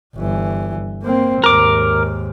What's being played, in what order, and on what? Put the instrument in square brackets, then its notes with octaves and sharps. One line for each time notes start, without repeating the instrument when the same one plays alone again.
[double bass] G1 E3
A#3 C4
[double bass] D#2 G#2 [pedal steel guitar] A#4 D6